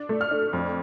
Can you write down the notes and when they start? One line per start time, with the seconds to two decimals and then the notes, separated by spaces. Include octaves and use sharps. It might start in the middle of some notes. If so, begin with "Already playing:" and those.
Already playing: D4
0.09 A3
0.21 F6
0.31 D4
0.53 F2